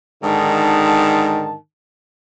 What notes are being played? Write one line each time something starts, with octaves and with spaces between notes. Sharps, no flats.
G#2 D3 D#3 A5